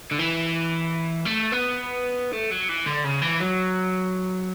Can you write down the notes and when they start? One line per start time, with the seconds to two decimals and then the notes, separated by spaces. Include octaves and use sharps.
0.11 D3
0.19 E3
1.26 A3
1.53 B3
2.33 A3
2.50 F#3
2.69 E3
2.86 D3
3.04 C#3
3.22 E3
3.40 F#3